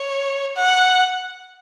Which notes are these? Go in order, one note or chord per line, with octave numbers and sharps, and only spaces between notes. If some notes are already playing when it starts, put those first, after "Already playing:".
Already playing: C#5
F#5